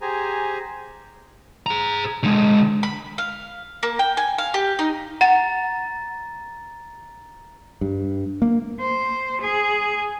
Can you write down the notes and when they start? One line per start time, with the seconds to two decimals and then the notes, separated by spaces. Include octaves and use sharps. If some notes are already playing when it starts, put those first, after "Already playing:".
0.01 G4 G#4 C5 G#5 A#5
1.67 G#4 A#5
2.24 D3 G#3
2.83 B5
3.18 F5
3.83 A#3
3.99 G5
4.17 G#5
4.38 F5
4.54 G4
4.79 D#4
5.21 F#5 A#5 A6
7.81 G2
8.42 A#3
8.80 C5
9.41 G#4